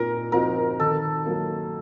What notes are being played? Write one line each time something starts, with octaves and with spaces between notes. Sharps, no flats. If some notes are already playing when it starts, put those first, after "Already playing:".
Already playing: A#2 C4 D#4 A#4
F3 C4 D#4 F#4 A#4
D#3 A4
F#3 A#3